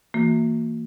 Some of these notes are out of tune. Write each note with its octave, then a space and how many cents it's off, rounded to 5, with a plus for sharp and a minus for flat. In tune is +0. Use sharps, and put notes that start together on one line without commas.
E3 +0 A#3 -25 F#4 -30